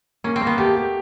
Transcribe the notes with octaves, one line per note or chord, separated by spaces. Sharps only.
A#3 C#4
C4
A#3
B3
A3 G4
G4